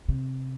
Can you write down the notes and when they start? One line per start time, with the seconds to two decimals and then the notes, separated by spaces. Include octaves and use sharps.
0.09 C3